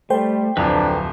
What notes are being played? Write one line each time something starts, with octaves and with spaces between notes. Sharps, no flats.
G3 A3 A4 C5 G5
D1 F2 D4 B4 A#5 E6